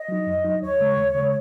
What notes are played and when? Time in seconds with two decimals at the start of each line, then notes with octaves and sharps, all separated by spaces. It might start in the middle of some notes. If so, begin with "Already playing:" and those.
Already playing: D#5
0.08 F#3 D#4
0.27 F#2
0.44 F#3 D#4
0.62 D#2 C#5
0.80 C#3 G#3
0.97 D#2
1.15 C#3 G#3